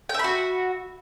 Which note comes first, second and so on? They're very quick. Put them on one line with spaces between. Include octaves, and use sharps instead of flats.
G5 E5 B5 F#4